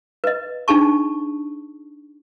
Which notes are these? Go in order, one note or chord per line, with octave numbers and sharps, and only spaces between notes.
B4 D#5
D4 D#4 G#4 A5 C#6